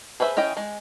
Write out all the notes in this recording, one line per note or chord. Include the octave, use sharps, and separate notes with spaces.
G#4 B4 C5 E5
C#4 E4 D#5 G5
G#3